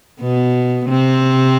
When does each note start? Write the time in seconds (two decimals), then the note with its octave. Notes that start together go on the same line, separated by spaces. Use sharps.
0.21 B2 B3
0.89 C3 C4